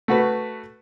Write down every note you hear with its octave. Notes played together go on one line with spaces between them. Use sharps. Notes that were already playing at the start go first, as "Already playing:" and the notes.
A3 F#4 B4